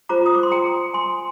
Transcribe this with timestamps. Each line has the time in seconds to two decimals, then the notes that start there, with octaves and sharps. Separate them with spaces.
0.09 F4 C5 A#5 D6
0.26 D#6
0.35 D6
0.43 C6
0.51 G5 A#5
0.94 G#5 C6